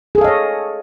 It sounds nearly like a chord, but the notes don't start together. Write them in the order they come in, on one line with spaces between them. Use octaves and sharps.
G#4 A4 F5 D#5 C#5